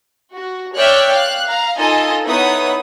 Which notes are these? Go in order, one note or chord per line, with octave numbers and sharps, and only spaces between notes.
F#4
C#5 D5 E5 G5 F6 F#6
F5 F#6
F5 A#5
D#4 F4 A4 D#5 G#5
B3 D#4 E4 B4 C#5 D#6